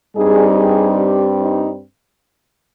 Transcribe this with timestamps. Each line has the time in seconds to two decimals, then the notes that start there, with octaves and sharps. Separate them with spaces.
0.15 G2 G3 C4 D#4 G#4
0.57 G#4
0.99 G4
1.40 D#4